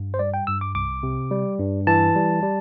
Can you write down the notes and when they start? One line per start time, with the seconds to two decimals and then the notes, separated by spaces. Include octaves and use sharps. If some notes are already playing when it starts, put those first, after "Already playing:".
Already playing: G2
0.14 C5
0.19 G3 D5
0.34 G5
0.47 G2 E6
0.61 D6
0.75 C2 D6
1.03 C3
1.31 G3
1.59 G2
1.87 E3 A5
2.15 G3
2.43 G3